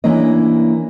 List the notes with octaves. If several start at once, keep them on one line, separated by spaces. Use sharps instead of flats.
E3 A#3 C#4 D4 D#5